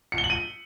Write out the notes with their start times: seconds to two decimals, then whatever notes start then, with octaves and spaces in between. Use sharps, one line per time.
0.12 C#7
0.18 G7
0.24 F#7
0.30 D#7